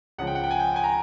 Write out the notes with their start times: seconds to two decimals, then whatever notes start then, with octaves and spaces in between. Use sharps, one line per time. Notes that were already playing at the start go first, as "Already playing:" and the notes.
0.18 C#2 C#3 F3 F#5
0.27 G5
0.35 F#5
0.44 G5
0.51 G#5
0.60 G5
0.76 G#5
0.84 A#5